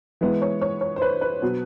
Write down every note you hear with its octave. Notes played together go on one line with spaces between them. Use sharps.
E3 G#3 B3
C#5
C#5
C#5
C5
B4
B4
B2 F#3 B3